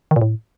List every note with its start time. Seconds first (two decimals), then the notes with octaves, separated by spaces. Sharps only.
0.11 D#3
0.16 A#2
0.21 A2